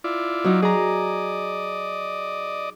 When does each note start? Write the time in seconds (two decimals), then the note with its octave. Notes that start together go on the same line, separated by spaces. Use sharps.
0.04 E4 F4 D5
0.44 F#3 D#4
0.62 G#4 D5 D#5 A#5